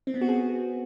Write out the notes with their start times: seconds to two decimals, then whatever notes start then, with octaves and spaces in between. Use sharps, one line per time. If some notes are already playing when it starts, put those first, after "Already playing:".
0.07 C4
0.14 B3
0.21 F#4
0.29 G#4